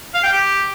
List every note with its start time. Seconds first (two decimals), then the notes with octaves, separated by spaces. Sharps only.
0.14 F5
0.23 G5
0.32 G4